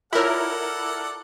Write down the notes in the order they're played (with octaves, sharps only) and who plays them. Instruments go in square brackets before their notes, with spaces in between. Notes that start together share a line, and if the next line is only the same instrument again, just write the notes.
[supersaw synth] E4 A#4 [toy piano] F4 C#5 [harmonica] A4 D5 F#5